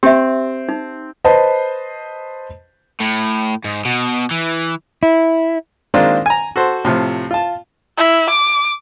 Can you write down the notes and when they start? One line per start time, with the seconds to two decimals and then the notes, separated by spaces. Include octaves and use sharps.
0.03 C4 G4 E5
0.69 D#4
1.25 B4 C5 D#5 A5
3.00 A2
3.64 G#2
3.85 B2
4.31 E3
5.03 E4
5.94 D#3 G#3 A#3 C4 D4 F4
6.26 G#5 A#5
6.56 F#4 A4 C5
6.85 A2 C3 F3
7.31 F4 A5
7.98 E4
8.29 D6